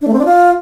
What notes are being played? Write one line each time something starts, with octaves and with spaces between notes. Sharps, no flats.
D4
A3
C4
D4
F4